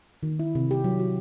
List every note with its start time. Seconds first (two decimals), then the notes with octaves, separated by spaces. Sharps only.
0.23 D#3
0.40 E4
0.55 C3
0.71 G4
0.84 F#3
1.00 F#4